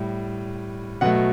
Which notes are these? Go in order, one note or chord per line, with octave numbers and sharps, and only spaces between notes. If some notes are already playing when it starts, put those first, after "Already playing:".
Already playing: A2 G3
B2 F#3 A3 F#5